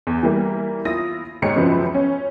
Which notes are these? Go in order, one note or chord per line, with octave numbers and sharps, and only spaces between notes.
E2
E3 G3 A#3
E4 F4 D#6 A#6
D#2 G#2 C#5 C#7
C#2 F#2 F3 C4 B4
C#4